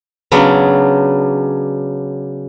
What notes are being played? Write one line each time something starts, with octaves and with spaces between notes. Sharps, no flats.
C#3 F#3 B3 D4